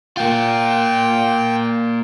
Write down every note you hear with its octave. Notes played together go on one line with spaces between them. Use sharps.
A#3 F4 G5